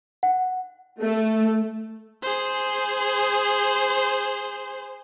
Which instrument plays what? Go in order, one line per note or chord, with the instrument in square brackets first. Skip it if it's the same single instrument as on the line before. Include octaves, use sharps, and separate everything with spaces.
[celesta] F#5
[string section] A3
[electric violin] G#4 C5